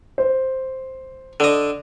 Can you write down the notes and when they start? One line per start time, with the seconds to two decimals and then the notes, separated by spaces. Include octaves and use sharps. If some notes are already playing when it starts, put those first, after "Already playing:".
0.18 C5
1.40 D3 D#5